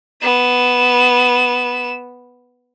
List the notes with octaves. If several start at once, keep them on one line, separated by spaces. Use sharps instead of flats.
B3 E7